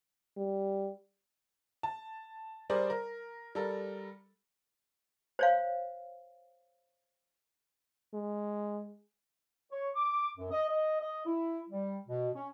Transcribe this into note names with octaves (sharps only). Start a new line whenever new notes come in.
G3
A5
G3 G#4 A#4 C5 D5
A#4
G3 A4 A#4
C5 C#5 F5
G#3
C#5
D6
F#2
D#5
D#5
D#5
E4
G3
B2
C#4